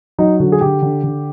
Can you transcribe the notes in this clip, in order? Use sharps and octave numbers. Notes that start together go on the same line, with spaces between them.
F#3 D#4
D3 F#4
G#4
D3 G4
D3
D3